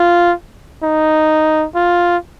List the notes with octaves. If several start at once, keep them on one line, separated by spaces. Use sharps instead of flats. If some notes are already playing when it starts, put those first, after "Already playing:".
Already playing: F4
D#4
F4